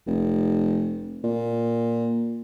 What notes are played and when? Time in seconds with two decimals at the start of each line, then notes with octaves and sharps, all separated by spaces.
0.07 F1
1.24 A#2